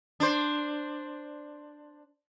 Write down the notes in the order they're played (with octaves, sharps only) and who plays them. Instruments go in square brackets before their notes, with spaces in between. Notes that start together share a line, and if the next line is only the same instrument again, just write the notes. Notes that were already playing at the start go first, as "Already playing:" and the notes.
[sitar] D4 C5